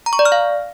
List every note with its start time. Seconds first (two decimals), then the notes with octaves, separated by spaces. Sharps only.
0.06 A#5
0.13 C#6
0.19 D5
0.25 F6
0.32 F5